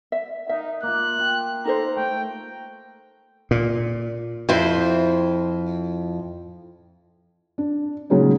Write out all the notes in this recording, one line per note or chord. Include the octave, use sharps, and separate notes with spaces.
E5
D#4 A#4 E5
A#3 F4 F#6
F4 G5
D#4 A4 C5 A#5
A3 G5
A#2
F2 C4 E4 C5
D4
A#2 C#3 F#3 G#3 C#4 D#4